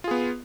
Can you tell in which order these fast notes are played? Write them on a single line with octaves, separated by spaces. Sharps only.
F4 G#4 B3